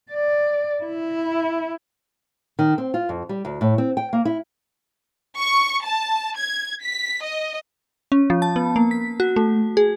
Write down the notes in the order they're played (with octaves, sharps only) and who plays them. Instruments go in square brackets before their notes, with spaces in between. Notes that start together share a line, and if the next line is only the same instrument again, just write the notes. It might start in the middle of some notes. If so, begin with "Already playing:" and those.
[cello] D5
E4
[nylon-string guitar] D#3
C4
F4
F2
G3
D2
A2
C4
G5
A#3
E4
[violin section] C#6
A5
G#6
B6
D#5
[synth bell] C#4
F3
A5
B3
A#3
B6
F#4
A3
G#4